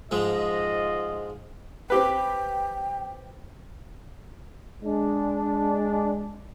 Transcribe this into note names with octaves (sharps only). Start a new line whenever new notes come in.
G#2 F3 G#3 F4 D#5
C4 G4 B4 G5
G#3 D4